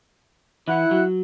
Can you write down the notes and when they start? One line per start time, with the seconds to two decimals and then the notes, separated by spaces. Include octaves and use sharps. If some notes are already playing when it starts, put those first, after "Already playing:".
0.68 E3 E4 F#5
0.91 F#3